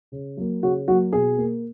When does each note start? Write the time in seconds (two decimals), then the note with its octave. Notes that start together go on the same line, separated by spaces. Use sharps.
0.12 C#3
0.37 F#3 A#3
0.63 C#3 F#4
0.88 F#3 A#3 F#4
1.12 B2 G#4
1.38 A#3